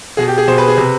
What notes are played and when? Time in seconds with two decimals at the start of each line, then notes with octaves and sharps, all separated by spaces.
0.17 B2 G#4
0.28 G4
0.38 G#4
0.48 B2 C5
0.58 B4
0.68 G#4
0.77 C3 B4